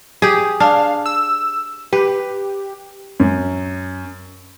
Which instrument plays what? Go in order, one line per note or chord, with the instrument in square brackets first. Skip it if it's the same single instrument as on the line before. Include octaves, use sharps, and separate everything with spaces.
[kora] G4 G#4
[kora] D4 [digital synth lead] F5
[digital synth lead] E6
[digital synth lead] G4 [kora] B4
[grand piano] F#2